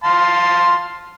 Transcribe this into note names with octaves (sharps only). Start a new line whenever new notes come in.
F5 A5 C6